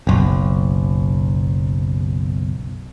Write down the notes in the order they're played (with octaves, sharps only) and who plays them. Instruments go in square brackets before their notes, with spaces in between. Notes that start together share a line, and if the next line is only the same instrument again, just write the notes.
[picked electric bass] F#1 B1